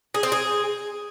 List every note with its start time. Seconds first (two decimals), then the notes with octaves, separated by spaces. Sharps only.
0.15 G#4
0.23 C4
0.32 G#4